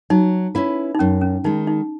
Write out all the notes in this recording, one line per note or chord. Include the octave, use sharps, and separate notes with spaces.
F#3 D#4
C#4 E4 B4
D#4
F#2 C#4
C#4
D#3 G#3 D#4
D#4